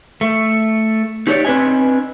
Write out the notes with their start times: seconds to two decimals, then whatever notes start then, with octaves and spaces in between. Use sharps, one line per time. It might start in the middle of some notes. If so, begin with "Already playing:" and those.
0.21 A3
1.27 D#4 G4 G#4 C#5 D5
1.45 C4 D4 B4 D#5 G#5